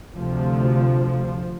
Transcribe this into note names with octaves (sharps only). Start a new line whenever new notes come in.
D2 C3 F3